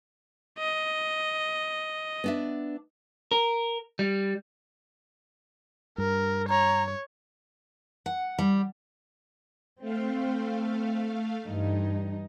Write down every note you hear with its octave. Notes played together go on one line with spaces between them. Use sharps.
D#5
B3 D4 E5
A#4
G3
G2 A#4
C#5 A#5
F#5
G3
A3 C4 F5
G2 E3 D#4